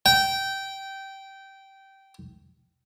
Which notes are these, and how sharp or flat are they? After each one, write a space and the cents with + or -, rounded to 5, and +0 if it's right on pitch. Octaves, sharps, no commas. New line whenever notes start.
G5 -15